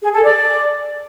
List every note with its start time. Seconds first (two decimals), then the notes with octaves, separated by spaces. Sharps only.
0.02 G#4
0.13 A4
0.23 D5